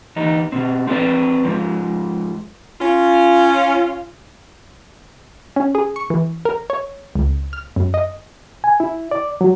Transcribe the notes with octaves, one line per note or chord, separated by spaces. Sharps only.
E2 D#4
B2 C4
C4 A4 B4 D5
G#2 F3
C#4 F4
C#4
G#4
C#6
E3
A#4
C#5
C#2
F6
F#2
D#5
G#5
E4
D5
F#3